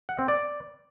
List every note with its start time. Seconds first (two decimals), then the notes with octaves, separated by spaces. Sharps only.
0.09 F#5
0.19 C4
0.28 D5